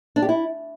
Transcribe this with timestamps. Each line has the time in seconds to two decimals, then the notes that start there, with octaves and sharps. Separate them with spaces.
0.16 D4
0.22 G4
0.29 E4